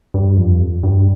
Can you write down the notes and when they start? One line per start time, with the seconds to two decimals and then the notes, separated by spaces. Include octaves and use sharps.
0.14 G2
0.37 F2
0.83 G2